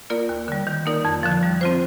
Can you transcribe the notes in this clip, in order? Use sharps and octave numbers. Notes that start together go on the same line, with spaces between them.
A#3 F4 A#4 D5
D#2
D3 G3
D#3
A#3 D#4 A#4 D5
F2
D3 F3
G3
C4 F4 C5